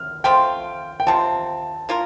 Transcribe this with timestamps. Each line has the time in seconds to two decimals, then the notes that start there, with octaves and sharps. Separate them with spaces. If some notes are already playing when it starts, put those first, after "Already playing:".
Already playing: F6
0.24 F3 A3 C4 F4 G5
1.00 G5
1.07 C3 F3 C4 A5
1.89 A#3 D4 F4 A#4